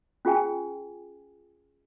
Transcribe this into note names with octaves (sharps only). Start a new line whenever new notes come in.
C#4 F4 G#4 G5 G#5